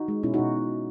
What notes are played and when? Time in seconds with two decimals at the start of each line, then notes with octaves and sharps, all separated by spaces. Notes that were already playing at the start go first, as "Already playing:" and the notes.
Already playing: D#4 F#4
0.08 G#3
0.23 B2 C#4 E4
0.34 B2 D#4 F#4